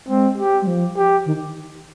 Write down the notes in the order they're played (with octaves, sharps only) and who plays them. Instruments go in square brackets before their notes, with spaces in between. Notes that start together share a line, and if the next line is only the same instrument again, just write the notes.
[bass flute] G#3 [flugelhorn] C4
[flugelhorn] G4
[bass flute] G3
F3
[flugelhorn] G4
[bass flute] D#3